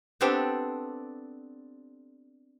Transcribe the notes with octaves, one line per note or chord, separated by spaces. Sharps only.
B3 C4 D4 G4 A4